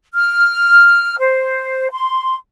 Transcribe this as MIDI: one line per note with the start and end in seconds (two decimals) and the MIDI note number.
0.14 1.16 89
1.19 1.88 72
1.91 2.36 84